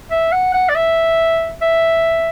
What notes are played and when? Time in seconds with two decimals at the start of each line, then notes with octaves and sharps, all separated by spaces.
0.11 E5
0.32 F#5
0.54 F#5
0.69 D5
0.75 E5
1.62 E5